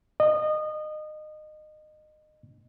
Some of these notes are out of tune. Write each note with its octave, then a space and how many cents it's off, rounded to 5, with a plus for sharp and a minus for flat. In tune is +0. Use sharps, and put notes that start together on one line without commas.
D#5 -25